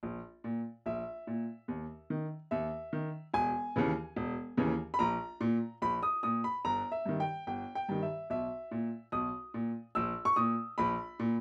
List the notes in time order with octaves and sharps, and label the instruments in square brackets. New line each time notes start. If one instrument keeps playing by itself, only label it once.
[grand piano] A#1
A#2
A#1 E5
A#2
D#2
D#3
D#2 E5
D#3
E1 G#5
D#2 C#3 E3
E1
D#2 C#3 E3
B5
A#1 A#5
A#2
A#1 B5
D#6
A#2 D#6
B5
G1 A#5
E5
G2 D#3
G5
G1 G5
G5
G2 D#3
E5
B1 E5
A#2
B1 D#6
A#2
A#1 E6
C#6
A#2 D#6
A#1 B5
A#2